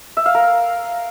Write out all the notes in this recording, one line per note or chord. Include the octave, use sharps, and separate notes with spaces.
E5
F5
A#4